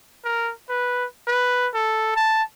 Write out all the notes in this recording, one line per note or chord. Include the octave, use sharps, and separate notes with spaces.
A#4
B4
B4
A4
A5